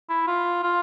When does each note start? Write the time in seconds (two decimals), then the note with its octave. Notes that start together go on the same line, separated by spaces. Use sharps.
0.09 E4
0.27 F4
0.63 F4